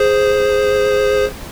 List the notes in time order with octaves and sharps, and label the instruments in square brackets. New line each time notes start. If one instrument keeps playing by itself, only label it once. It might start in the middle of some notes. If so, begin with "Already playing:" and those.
Already playing: [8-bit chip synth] G#4 C5